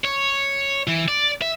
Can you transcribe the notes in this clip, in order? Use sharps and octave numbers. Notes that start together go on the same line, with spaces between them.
C#5
E3
D5
E5